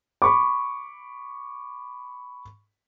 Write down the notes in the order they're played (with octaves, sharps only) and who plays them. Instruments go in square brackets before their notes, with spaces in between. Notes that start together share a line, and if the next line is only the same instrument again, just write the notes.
[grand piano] B5 C#6 D6